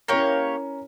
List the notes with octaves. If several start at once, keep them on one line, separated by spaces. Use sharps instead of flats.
A#3 C#4 E4 G4 A#4 C#5